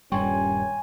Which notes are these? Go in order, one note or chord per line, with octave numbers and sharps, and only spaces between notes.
D#1 G2 G3 C#4 G5 G#5 C6 C#6